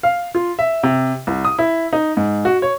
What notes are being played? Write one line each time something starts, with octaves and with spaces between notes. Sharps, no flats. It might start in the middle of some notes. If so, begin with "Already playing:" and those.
F5
F4
E5
C3
C2
D#6
E4
D#4
G#2
F#4
C#5